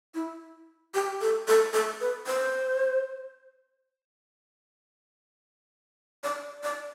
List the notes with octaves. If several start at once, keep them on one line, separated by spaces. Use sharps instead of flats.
E4
G4
A4
A4
A4
B4
C5
D5
D5